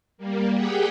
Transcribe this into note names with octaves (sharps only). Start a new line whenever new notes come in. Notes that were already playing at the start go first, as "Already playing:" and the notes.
G3 A#3
G4 G#4 F#5 G5